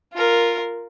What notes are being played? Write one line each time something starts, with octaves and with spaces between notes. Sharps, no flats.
F4 A#4